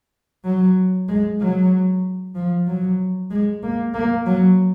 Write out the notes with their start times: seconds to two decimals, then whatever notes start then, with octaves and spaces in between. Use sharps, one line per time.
0.44 F#3
1.08 G#3
1.40 F#3
2.35 F3
2.67 F#3
3.30 G#3
3.63 A#3
3.94 A#3
4.26 F#3